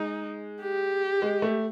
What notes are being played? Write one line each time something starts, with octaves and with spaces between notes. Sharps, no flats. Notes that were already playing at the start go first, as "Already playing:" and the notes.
Already playing: G#3 D#4
G4
G#3
A3